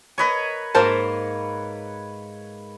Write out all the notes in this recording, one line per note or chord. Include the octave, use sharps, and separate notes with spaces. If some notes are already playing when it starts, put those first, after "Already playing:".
A#4 B4 C#5 D#5 G#5
G#2 A#3 A#4 C5 A5